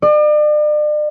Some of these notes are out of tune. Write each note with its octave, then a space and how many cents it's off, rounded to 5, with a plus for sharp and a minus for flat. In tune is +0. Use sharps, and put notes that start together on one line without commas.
D5 +40